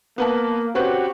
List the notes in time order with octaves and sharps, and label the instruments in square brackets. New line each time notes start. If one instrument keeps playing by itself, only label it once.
[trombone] A#3 [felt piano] B3 B4 A5
[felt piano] C4 C#4 B4 [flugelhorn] F#4 [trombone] G4